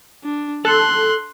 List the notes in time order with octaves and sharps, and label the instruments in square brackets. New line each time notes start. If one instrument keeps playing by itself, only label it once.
[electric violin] D4
[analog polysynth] A4 [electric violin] C6 F#6